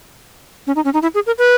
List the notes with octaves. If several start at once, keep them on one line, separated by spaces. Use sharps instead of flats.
C#4
D#4
C#4
D#4
E4
G#4
A#4
B4